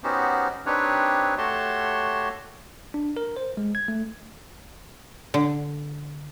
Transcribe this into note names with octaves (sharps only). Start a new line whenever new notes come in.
B3 C#4 D#4 F#4 G4 C5
C4 D4 D#4 G4 B4 C#5
A3 F#4 G4 C#5 A5 C6
D4
A#4
C5
G#3
G#6
A3
D3